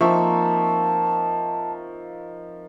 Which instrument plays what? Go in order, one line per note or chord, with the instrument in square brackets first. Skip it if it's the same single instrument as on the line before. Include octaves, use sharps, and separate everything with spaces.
[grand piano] F3 E5 C#6 [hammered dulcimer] A#3 C4 D#4 [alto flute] A5